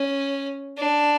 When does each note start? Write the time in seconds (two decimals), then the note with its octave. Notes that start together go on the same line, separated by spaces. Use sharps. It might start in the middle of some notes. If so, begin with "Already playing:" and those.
Already playing: C#4
0.78 D4